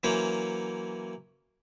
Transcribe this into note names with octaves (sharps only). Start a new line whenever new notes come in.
E3 F#3 A#3 C#4 C5